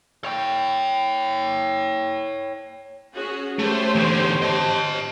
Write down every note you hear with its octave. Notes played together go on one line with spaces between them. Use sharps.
C#5 G5
C#4 F#4 G#4
A3 G4 C5 C#5
E2 D3
D#5 A5